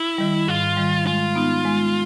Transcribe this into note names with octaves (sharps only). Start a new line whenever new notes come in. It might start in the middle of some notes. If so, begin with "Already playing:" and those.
Already playing: E4
D#3 G3
G#2 F4
D#3 G3
G#3 F4
B3 D#4
G#3